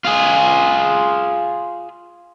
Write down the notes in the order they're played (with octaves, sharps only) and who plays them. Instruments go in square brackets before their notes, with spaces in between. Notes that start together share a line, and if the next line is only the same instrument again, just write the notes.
[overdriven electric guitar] F4 G#4